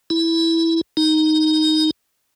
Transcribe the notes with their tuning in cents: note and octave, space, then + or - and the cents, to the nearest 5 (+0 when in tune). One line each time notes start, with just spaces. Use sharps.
E4 -5
D#4 +0